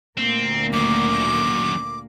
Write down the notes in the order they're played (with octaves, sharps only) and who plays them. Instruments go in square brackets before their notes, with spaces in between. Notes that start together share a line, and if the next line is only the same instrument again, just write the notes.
[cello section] D2 A#2 A#3 [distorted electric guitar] C4
[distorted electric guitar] F#2 D#3 [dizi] D6